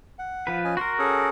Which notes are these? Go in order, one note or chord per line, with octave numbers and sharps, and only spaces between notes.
F#5
F3 B4
C#4 D#5 G#5
F#4 A#4 C6
C#4 G#4 A4